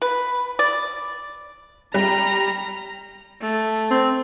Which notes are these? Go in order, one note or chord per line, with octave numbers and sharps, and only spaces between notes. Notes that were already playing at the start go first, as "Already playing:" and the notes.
B4
D5
G3 A#5
A3
C4